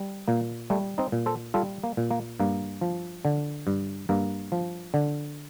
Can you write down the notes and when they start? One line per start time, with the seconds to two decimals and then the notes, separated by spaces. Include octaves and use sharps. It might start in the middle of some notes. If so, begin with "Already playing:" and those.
Already playing: G3
0.28 A#2 A#3
0.70 G3 A3
0.98 C4 D#4
1.12 A#2
1.26 A4 C5
1.54 G3 F4 A4
1.84 A#3
1.97 A#2
2.11 A#3
2.40 G2 A#3
2.81 F3
3.25 D3
3.67 G2
4.09 G2 A#3
4.52 F3
4.94 D3